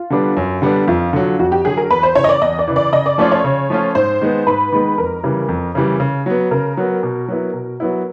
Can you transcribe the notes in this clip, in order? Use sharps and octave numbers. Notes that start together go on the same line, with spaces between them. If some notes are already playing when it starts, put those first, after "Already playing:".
Already playing: F4
D3 G3 B3 D4
F#2
D3 G3 B3 D4
F2 F4
D3 F#3
F2 F#4
G4
D3 F#3 G#4
A#4
E2 B4
C5
C#3 E3 C#5
D#5
D5
E2 D#5
D5
C#3 E3
D5
C#3 D#5
D5
F3 A3 C#4 F4 D5
C#5
C#3
F3 A3 C#4 F4
G#2 C5
D#3 G#3 B3
G#2 B4
D#3 G#3 B3
F2 A#4
C#3 E3 G3
F2
C#3 E3 G3
C#3
F#3 B3
C#3 A#4
F#3 B3
B2
F#3 B3 E4
B2
F#3 B3 E4